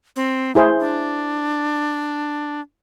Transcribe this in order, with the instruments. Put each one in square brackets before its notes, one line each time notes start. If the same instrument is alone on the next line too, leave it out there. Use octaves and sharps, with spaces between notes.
[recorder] C4
[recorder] A3 [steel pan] E4 G#4 C5
[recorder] D4